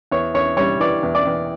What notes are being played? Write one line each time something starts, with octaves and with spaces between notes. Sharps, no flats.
E2 C#5
E2 C#5
G3 C#5
E3 D5
E2
D5
E2